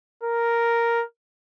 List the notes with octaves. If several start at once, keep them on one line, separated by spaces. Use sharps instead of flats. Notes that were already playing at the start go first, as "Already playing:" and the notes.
A#4